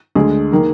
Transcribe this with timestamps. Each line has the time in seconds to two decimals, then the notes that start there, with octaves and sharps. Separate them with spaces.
0.16 D2 D3 G#3 G#4
0.52 D#3 A#3